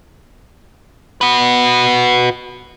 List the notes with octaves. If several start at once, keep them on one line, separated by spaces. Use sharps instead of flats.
F#4 B4